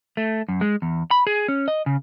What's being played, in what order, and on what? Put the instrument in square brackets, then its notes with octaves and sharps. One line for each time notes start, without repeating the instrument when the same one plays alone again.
[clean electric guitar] A3
F#2
G#3
E2
B5
G#4
C#4
D#5
C#3